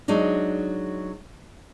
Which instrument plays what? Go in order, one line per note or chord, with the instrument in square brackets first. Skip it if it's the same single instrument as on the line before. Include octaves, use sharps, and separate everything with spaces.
[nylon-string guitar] F#3 G#3 D4 D#4